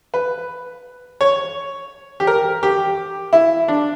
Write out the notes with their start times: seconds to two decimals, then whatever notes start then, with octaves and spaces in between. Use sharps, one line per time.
0.14 B4
1.21 C#5
2.20 G4
2.27 A#4
2.63 G4
3.33 E4
3.68 D4